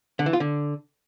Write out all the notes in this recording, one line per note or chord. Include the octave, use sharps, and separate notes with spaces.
D3
E3
F4
D3